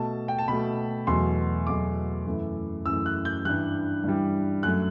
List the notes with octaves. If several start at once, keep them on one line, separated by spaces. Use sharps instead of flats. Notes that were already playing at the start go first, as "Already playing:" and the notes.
Already playing: B2 A3 A5
G5
A5
B2 A3 B5
E2 B2 F#3 A3 C6
E2 B2 F#3 A3 D6
F#2 E3 A3
F#2 E3 A3 E6
F#6
G6
G2 E3 G3 F#6
G2 E3 G3
F#2 F#3 A3 F#6